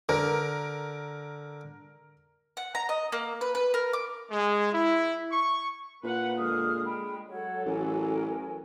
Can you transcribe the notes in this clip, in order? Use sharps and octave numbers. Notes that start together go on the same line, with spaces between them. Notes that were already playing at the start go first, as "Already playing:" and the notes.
D3 A#4
F#5
A#5
D#5
A#3
B4
B4
A#4
D6
G#3
E4
C#6
A#2 B4 F#5
D3 G#3 G#4 D#6 F6
G#3 G5 B5
F#3 A4 C#5 F#5
A1 C#4 A#4 G#5